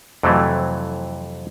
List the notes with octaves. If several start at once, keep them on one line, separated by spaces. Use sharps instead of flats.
F2 C3 E3 F#3 A3